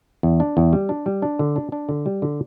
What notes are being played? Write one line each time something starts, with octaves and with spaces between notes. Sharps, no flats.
E2
D4
E2
G3
D4
G3
D4
D3
D4
D4
D3
G3
D3